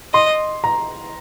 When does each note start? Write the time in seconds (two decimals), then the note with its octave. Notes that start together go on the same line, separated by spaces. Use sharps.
0.13 D#5 C6
0.64 A#5